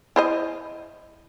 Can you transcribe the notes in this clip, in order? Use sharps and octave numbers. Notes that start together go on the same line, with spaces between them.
E4 C5 D#5